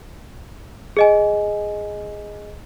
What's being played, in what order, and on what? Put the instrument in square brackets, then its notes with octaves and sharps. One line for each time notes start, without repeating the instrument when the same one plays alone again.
[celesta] G#4 D#5 G#5